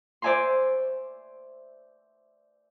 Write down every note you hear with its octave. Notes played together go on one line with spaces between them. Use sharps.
C5 D5 E5 G#5 A#5 C6